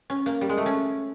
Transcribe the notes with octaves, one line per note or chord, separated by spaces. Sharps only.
C#4
A#3
G3
G#3
A3
C#4